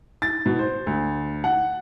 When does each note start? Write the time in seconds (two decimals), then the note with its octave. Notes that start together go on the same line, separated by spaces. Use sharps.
0.22 A6
0.46 B2
0.59 C5
0.87 D2
1.44 F#5